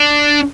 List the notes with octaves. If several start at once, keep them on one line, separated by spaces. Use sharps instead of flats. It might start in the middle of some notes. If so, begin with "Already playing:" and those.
Already playing: D4